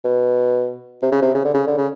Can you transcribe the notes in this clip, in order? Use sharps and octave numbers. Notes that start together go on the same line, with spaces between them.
B2
C3
C#3
C3
C#3
D3
C#3
D3
C#3